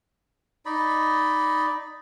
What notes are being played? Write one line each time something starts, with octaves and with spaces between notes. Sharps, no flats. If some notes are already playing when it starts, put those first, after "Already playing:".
D#4 D5 D#5 B5